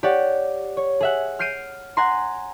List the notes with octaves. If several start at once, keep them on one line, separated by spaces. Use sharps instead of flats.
G4 C#5 D5 F#5
C#5
G#4 E5 F#5
F6 G6 C7 D7 D#7
F#5 G#5 A#5 C6